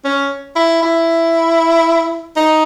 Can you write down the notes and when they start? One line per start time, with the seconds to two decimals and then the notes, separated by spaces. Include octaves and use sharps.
0.05 C#4
0.56 E4
0.82 E4
2.36 D#4